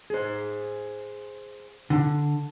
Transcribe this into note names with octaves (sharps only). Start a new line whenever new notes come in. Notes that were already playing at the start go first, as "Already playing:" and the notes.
G#4 C5
D3